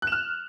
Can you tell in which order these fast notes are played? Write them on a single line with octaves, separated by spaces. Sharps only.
F#6 E7 F6